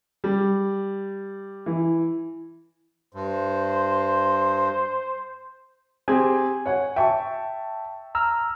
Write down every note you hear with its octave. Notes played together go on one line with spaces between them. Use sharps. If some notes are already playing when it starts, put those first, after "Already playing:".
G3
E3
G2 C5
C4 G4 G#4 G#5 G#6
C#5 F#5
E5 G5 A5 C#6
A#5 E6 F6